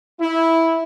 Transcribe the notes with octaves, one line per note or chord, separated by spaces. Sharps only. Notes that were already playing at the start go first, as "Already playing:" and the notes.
E4